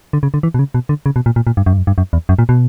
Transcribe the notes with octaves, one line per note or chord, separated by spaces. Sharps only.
D3
C#3
D3
E3
B2
C#3
B2
D3
C#3
B2
A#2
A#2
A#2
G2
F#2
G2
F#2
G2
F#2
E2
F#2
A#2
B2